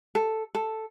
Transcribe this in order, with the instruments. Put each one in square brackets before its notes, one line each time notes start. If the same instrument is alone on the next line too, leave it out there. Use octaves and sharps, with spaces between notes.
[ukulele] A4
A4